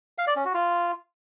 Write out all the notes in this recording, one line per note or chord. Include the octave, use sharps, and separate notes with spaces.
F5
D5
C#4
F#4
F4